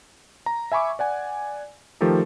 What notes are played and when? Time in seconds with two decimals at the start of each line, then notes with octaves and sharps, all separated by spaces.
0.46 A#5
0.72 E5 G#5 B5 C#6 D6
0.99 D5 F#5 G#5
2.01 D#3 F3 A3 G4 A4 A#4